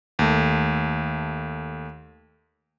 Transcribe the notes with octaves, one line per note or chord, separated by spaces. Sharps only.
D#2 A3